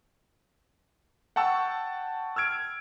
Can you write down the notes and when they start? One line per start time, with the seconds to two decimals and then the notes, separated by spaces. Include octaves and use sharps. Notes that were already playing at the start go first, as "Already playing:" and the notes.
1.36 F#5 G5 A5 C#6 E6
2.36 E6 F6 G#6 D7